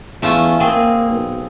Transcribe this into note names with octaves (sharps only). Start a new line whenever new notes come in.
E2 A3 C#4 F4
A#3 C4 G#4
B1